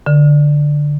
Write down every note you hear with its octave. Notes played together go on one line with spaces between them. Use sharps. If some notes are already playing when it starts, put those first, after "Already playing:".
D3